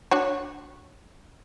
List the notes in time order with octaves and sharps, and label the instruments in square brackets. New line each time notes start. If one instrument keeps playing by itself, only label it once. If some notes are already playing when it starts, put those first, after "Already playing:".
[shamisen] D4 F#4 C#5